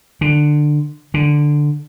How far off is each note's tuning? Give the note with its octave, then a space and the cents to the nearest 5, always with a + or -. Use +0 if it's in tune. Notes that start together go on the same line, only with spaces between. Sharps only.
D3 +15
D3 +5